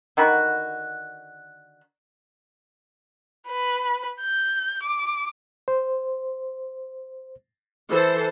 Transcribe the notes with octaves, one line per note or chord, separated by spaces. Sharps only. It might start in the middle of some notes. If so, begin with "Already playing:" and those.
D3 D#3 F#4 B5
B4
G6
D6
C5
E3 A4 C5